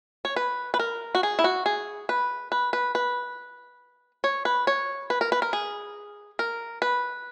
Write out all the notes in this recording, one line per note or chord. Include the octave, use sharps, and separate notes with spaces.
C#5
B4
B4
A#4
F#4
G#4
E4
F#4
G#4
B4
B4
B4
B4
C#5
B4
C#5
B4
A#4
B4
A#4
G#4
A#4
B4